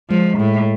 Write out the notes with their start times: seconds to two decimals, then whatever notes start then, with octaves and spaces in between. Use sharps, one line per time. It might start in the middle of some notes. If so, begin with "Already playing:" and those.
0.11 F3 G#3
0.39 A2 G#3